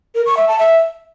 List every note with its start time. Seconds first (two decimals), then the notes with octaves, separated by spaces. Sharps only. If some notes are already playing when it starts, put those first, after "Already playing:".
0.15 A#4
0.26 C#6
0.37 E5
0.48 A5
0.59 E5